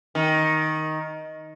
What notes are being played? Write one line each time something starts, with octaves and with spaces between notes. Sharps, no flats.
D#3